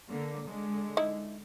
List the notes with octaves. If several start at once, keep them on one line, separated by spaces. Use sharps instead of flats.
D3 A#3
D3 G#3
D#4 E4